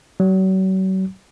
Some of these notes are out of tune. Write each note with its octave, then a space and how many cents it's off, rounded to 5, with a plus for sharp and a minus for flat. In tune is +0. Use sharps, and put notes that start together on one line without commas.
F#3 +40